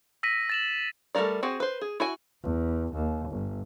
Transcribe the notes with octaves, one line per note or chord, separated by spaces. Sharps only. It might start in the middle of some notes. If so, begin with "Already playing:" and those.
E6 A#6 B6 D#7
A6 E7 F#7
G3 A3 B3 A#4 D5
C4 F#4 G#4
B4 C5
G#4
E4 F#4 G#5
E2
D#2
G1